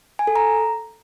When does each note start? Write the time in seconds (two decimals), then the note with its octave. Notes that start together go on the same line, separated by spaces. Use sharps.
0.19 G#5
0.27 A4
0.36 A#5